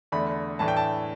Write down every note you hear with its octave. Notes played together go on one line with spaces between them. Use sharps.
E2 D3 A3 D4 B5
A2 E3 A3 D4 A5
G5
A5